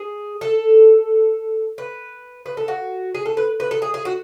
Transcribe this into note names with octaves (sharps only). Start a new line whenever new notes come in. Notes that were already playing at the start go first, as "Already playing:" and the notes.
Already playing: G#4
A4
B4
B4
A4
F#4
G#4
A4
B4
B4
A4
G#4
G#4
F#4